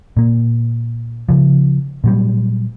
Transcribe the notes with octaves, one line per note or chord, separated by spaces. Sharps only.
A#2 A#3
C#3 F3
A#2 F#3 G3